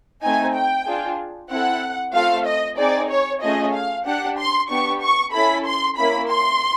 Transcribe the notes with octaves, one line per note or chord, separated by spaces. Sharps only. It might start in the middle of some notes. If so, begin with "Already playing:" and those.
A3 C4 D#4 G#5
G5
D4 F4 G#4
C4 E4 A4 F#5
A3 C4 F4 A4 F5
D#5
C4 D#4 G#4 D5
C#5
A3 C#4 F4 G#4 D#5
F5
D4 G4 F#5
C6
B3 D4 G4 C#6
C#6
C#4 E4 A4 B5
C6
A#3 C#4 E4 B5
C6